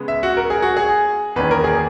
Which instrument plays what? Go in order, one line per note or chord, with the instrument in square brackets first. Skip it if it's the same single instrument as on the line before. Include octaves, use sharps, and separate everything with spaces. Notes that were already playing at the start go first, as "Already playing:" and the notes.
Already playing: [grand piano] C#3 G#3 B3
E5
F#4
A#4
G#4
F#4
G#4
E2 D#3 A#3 C#4 B4
A#4
G#4